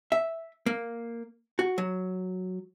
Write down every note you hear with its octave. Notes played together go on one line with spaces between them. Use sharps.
E5
A#3
F#4
F#3